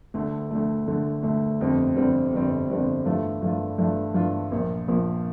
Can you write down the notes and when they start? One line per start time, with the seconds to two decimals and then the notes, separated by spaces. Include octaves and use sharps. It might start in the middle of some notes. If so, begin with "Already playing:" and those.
0.14 D2 D3 A3
0.51 D2 D3 A3
0.87 D2 D3 A3
1.23 D2 D3 A3
1.60 G1 F2 D3 G3 C4
1.96 G1 F2 D3 G3 C4
2.33 G1 F2 D3 G3 C4
2.69 G1 F2 D3 G3 C4
3.05 G2 E3 A3 D4 F4
3.42 G2 E3 A3 D4 F4
3.78 G2 E3 A3 D4 F4
4.14 G2 E3 A3 D4 F4
4.51 A#1 A#2 F3
4.88 A#1 A#2 F3